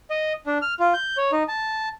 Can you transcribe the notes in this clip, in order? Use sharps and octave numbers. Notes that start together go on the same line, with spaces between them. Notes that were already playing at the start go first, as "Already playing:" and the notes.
D#5
D4
F6
F4
G6
C#5
D#4
A5